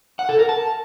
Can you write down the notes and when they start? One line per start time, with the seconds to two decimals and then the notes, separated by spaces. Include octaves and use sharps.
0.19 F#5
0.29 A4
0.39 A#4
0.49 A5